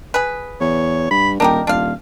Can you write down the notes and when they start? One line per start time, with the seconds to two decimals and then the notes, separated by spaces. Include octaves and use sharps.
0.14 G#4 B4
0.61 E2 C#5
1.11 G2 B5
1.40 D#1 D4 D#4 G4 A#4
1.67 D#1 D4 F4 F5